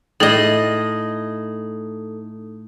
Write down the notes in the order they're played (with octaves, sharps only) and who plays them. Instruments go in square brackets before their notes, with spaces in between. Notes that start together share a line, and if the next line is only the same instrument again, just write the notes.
[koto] A2 D#5 [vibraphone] D#4 A4